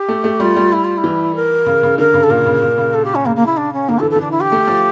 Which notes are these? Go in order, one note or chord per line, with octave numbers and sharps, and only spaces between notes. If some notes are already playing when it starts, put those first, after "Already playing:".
Already playing: G4
A3
A3
G3 F4
G3
E4
F4
E4
E3
A#4
C#3
C#3
D3 A#4
C#3
A4
A#2 A#4
C#3
A#2
C#3
A4
G4
C#4
C#3 A#3
A#3
E4
D4
C#4
D3 A#3
A4
E3
A4
D3 D4
E4
G4
A3
F3